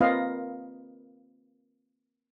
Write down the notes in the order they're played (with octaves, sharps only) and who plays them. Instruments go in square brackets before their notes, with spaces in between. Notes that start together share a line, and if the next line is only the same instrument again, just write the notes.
[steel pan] A#3 C4 F4 B4 D#5 F5